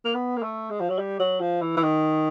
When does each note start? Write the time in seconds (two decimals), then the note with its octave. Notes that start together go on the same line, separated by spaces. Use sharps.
0.05 A#3
0.14 B3
0.37 A#3
0.43 A3
0.70 G#3
0.80 F3
0.90 F#3
0.99 G3
1.20 F#3
1.41 F3
1.62 E3
1.77 E3
1.83 D#3